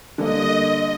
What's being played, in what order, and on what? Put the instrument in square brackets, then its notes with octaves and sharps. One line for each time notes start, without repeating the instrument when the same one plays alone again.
[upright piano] D3 G3 A#3 [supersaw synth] D#5